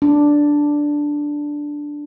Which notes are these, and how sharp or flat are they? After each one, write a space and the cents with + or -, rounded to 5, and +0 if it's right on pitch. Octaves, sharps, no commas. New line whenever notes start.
D4 +0